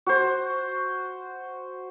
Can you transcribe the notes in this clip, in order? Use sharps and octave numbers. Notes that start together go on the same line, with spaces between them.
F#4 C5